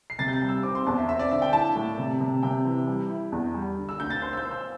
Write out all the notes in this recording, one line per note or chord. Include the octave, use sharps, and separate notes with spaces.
C7
C3 A6
G6
A6
G3
E6
C4 D6
C6
E2 A5
E5
C4 E5
D5
D3 E5
G5
E4 A5
A2
C3
C3
C3 G5
E3
G3
E4
E2
G3
D3
E6
D2 G6
A6
C5 G6
E6
G6
C5
E6